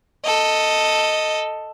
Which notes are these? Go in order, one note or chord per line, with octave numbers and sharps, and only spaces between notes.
A4 D#5